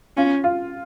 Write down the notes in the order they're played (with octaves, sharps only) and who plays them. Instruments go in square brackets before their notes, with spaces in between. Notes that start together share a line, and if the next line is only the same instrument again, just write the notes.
[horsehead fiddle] C#4 [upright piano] F4
[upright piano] F4